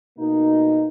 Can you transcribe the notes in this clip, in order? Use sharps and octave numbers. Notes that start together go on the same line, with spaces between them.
B2 A#3 D#4